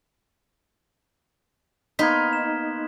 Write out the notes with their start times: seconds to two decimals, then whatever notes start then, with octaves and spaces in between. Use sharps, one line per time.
1.99 A#3 B3 D#4 C6 G#6 B6
2.33 E7